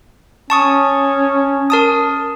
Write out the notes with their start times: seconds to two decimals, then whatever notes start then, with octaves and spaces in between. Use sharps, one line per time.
0.50 C#4 A5 C#6 D#6
1.70 A#4 A5 D#6